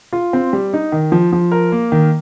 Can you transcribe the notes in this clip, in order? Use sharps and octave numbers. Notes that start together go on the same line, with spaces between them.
F4
C4
G3
D#4
D#3
F3
F3
A#4
A#3
D#3